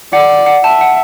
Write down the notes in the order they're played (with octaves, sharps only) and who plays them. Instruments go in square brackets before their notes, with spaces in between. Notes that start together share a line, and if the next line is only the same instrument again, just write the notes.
[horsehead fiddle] D5 [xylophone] F#5
[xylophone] F#5
F#5
[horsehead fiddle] E5 [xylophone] A5
[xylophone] F#5